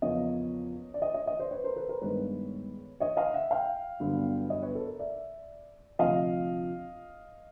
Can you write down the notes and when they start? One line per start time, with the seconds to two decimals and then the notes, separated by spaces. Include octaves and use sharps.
0.02 E2 C#3 F3 A#3 C#5 D#5
0.94 D5
1.02 C#5 D#5
1.14 C#5 D#5
1.26 C#5 D#5
1.40 C5 D5
1.51 B4 C#5
1.64 A#4 C5
1.76 A4 B4
1.89 A#4 C5
2.02 G2 D#3 G#3 B3 B4 C#5
3.00 C#5 D#5
3.17 D#5 F5
3.34 E5 F#5
3.51 F5 G5
4.00 G1 G2 D3 F#3 B3
4.50 C#5 D#5
4.62 B4 C#5
4.75 A4
4.87 A#4
4.99 D5 E5
5.99 D2 C3 F3 D#5 F5